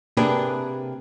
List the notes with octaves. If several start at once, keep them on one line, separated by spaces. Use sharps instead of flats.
C3 A#3 D4 G#4 A#4 B4